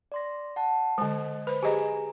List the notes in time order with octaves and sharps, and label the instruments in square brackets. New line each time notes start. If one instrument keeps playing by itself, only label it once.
[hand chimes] D5 C6 A#6
F#5 A5
[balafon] D3 G#3 [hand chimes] C5 D#5
[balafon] B4 C5 [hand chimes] B5
[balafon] G4 G#4 D#5 [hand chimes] G#5 A#5